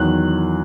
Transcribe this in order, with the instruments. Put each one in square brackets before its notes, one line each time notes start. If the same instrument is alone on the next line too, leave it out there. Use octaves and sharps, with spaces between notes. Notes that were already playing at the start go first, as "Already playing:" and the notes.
Already playing: [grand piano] E2 D#3 F#3 F#6